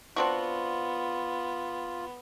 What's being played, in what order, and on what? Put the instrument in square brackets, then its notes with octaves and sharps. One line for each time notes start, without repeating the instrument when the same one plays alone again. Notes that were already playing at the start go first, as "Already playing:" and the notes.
[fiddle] B3 [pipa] C4 D4 F#4 [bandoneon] F4